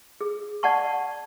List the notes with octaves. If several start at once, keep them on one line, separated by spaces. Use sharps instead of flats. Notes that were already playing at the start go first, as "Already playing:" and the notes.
G#4
D5 F#5 A5 C#6